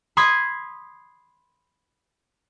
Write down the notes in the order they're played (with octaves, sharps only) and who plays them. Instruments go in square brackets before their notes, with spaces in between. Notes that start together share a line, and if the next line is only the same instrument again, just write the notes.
[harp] B5 C6 D#6 G#6